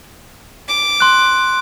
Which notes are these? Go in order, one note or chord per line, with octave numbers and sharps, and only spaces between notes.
D6
C6 F#6